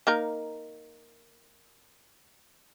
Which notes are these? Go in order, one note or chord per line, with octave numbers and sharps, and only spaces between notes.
A#3 D#4 A#4